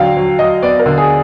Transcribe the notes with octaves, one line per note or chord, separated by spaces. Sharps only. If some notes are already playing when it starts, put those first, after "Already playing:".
Already playing: D3 F#3 F5 G5
F#3
F#3 D#5
B3 D5
A#4
D3
G#4